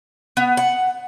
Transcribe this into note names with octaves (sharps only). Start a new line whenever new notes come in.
B3
F#5